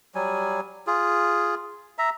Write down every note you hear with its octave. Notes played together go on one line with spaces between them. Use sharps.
F#3 G3 G#5
F4 G#4
E5 A#5